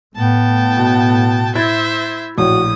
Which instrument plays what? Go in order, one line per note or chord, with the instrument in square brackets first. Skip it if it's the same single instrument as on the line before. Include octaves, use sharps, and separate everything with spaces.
[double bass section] A2 [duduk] B3 [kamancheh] G5 A5
[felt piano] B2
[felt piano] E4 G#6 A6 [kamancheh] C5 E5
[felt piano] A#1 A2 [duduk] F#4 [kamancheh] D#6